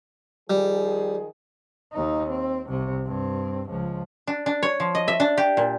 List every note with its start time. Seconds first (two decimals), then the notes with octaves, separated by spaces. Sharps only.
0.50 D#3 F3 G3 G#4
1.93 D#2 D#4
2.30 C4
2.67 C2 C3
3.06 G2 C4
3.70 C#2 F3
4.27 D4
4.46 D4
4.63 C#5
4.80 F3
4.95 D#5
5.08 E5
5.20 D4
5.37 G4
5.57 A#2